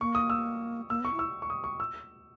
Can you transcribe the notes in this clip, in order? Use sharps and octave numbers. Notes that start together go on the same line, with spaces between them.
A#3 C#6
D#6
E6
A#3 E6
B3 C#6
E4
E6
C#6
D#6
C#6
E6